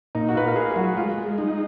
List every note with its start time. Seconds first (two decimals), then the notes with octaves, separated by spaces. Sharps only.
0.15 A#2 D#4
0.29 F#4
0.35 F4 B4
0.43 A#4
0.56 F4 G#4
0.71 G#4
0.76 F#3 F#4
0.97 G#3 F4
1.18 G#3
1.38 D#4